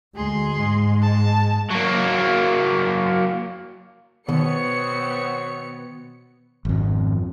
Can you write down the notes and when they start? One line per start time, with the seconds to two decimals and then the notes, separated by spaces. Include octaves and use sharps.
0.16 D2 G#3 G#4 C6
0.58 G#2 G#3
1.02 A5
1.70 F#3 A#3
4.29 B2 D#3 B3 C4 C#5 C#7
6.65 G#1 F2